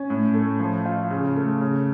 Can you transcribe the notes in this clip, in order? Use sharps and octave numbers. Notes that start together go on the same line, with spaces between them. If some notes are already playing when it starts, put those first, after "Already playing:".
Already playing: C#4
A2
A3
F3
F4
C#3
A3
C#3